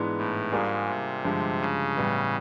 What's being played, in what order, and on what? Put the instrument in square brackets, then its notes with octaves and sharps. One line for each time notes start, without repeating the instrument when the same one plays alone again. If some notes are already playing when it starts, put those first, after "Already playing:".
Already playing: [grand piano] G#2 E3 G#3 B3 D4
[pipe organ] A2
[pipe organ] G#2 [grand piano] G3 A#3 D4 F4 G#4
[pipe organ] C3
[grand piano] G2 D3 F3 G#3
[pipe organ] C#3
[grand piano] A2 E3 G3 B3